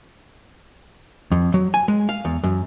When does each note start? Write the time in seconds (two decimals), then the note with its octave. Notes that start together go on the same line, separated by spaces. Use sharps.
1.32 F2
1.54 F#3
1.74 G#5
1.88 G#3
2.09 F5
2.25 E2
2.44 F#2